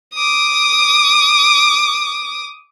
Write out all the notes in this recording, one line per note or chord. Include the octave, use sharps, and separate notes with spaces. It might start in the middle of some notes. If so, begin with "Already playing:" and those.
D6 D#6